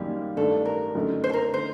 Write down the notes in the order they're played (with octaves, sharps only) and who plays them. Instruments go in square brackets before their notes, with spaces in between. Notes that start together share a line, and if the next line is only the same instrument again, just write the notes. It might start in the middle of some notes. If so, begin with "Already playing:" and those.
Already playing: [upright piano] F#2 D#3 G3 A#3 [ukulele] G4
[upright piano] G2 D#3 A3 D4 [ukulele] A4
[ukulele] A#4
[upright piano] F#2 D3 A3 D#4
[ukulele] C5
A4
A#4
[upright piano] D3 A3 D#4 [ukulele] C5